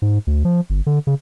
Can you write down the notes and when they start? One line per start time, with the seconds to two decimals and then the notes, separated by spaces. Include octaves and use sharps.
0.02 G#2
0.27 D2
0.45 F3
0.70 G1
0.86 D3
1.07 C#3